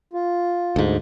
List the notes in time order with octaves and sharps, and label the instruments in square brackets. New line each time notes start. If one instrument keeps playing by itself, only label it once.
[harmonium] F4
[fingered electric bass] D2 G#2